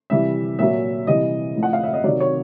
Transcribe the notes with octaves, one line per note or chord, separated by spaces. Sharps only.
C3 E3 G3 E5
A#2 F#3 E5
C3 E3 G3 D#5
A2 F3
F#5
F5
E5
D#5
C3 D#3 F#3 D5
C#5